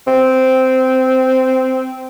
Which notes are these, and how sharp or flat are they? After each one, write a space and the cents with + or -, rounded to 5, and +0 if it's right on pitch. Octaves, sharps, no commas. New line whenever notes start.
C4 -10